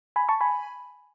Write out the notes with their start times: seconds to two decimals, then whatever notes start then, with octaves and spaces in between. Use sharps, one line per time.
0.16 G#5 B5
0.29 A5 C#6
0.41 G#5 B5